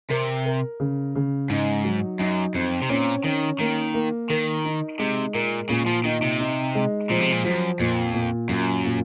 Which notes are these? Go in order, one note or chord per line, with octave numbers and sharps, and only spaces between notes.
C3 A#4
A#4
C#3
C#3
G#2 D#4
F#3
F#2 D#4
F2 C4
C3
A#2 C#4
D#3 C#4
D#3 A#3
A#3
D#3 A#4
D#4
C3 G#3
A#2 A#4
A#2 C#3
F3
D#3 D#4
C3
D#4
G#3
A#2 F3
C3
A#2
F#2 F3
F2 A#2
A#2
F#2 A#2
A#2